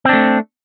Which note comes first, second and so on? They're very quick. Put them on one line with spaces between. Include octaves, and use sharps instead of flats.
C4 D4 A3